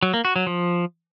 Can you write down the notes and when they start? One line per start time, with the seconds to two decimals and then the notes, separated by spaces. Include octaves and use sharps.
0.03 F#3
0.14 A#3
0.25 F#4
0.36 F#3
0.47 F3